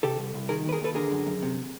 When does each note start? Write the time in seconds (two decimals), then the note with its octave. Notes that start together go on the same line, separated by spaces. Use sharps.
0.03 C3 G4 A4
0.19 C2
0.34 C2
0.49 D#3 G#4 A#4
0.65 D#2 B4
0.72 G#4 A#4
0.80 D#2 A4 B4
0.95 D3 G#4 A#4
1.12 F#2
1.26 F#2
1.42 C3